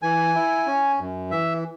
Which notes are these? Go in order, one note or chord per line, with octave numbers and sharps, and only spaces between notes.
E3 G#5
E4
C#4
F#2
E3 E5